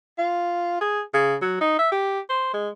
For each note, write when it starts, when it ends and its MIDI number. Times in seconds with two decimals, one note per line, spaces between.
0.18 0.78 65
0.81 1.01 68
1.14 1.35 49
1.42 1.60 54
1.61 1.78 63
1.79 1.88 76
1.92 2.20 67
2.29 2.50 72
2.53 2.69 56